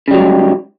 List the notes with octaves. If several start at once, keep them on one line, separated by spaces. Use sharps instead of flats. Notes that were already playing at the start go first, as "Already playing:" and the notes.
G#2 C#3 F#3 G3